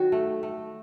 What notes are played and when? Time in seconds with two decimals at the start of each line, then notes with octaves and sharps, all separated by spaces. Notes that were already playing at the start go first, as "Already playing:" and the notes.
Already playing: D#3 F#3 F#4
0.12 A3
0.43 A3